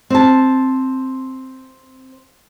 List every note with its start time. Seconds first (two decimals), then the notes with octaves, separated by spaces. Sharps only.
0.10 C4 A5